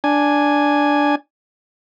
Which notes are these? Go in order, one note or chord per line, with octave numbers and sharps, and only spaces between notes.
D4 G#5